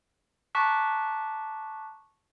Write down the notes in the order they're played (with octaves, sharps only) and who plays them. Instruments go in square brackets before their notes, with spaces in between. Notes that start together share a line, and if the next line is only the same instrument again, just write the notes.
[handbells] A5 A#5 C#6 D6 F#6 B6